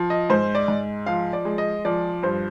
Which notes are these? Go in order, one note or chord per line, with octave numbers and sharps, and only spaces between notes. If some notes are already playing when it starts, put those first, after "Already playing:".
Already playing: F3
D#5
G#2 C5
D5
G#2
F3 F5
D5
G#3
D#5
F3 D5
G2 C5